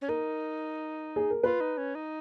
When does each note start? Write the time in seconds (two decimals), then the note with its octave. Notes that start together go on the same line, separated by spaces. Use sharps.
0.01 C#4
0.08 D#4 A#4
1.16 G#4
1.30 A#4
1.43 F4 B4
1.61 D#4
1.78 C#4
1.95 D#4